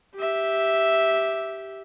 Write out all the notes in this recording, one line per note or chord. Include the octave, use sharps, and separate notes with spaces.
G4 E5